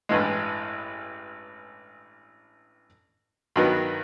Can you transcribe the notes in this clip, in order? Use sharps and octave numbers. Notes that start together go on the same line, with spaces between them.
A1 G2 E3 G#3
G2 D#3 F#3 B3